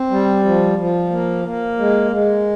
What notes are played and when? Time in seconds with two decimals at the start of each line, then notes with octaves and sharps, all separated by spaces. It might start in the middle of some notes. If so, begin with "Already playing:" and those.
Already playing: C4
0.10 G3
0.45 F3
0.77 F3
1.11 A#3
1.45 A#3
1.79 G#3
2.12 G#3